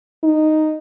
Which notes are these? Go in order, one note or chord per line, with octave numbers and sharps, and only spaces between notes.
D#4